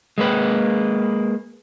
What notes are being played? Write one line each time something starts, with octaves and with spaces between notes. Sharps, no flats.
G#3 A#3 B4